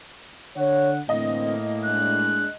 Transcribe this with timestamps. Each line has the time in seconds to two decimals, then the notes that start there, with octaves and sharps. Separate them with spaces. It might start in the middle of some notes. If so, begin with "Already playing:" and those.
0.57 D3 C#5 F#5
1.09 A2 D3 E3 A#3 C4 D#5
1.85 G#3 D4 F#6